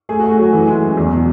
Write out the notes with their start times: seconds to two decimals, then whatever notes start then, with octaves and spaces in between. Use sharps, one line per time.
0.09 A3 G#4
0.20 F#4
0.24 A3
0.31 F#4
0.38 F#3 G#4
0.53 E3
0.68 G#3
0.83 F#2
0.97 E2
1.11 B2